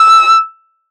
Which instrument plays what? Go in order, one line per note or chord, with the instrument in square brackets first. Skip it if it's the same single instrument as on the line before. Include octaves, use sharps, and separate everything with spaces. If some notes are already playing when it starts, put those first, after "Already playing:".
Already playing: [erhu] E6